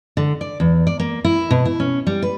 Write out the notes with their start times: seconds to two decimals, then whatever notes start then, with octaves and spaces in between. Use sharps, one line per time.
0.17 D3
0.41 D5
0.60 E2
0.87 D5
1.00 A#3
1.24 E4
1.51 B2
1.65 E4
1.80 C#4
2.07 G3
2.22 B4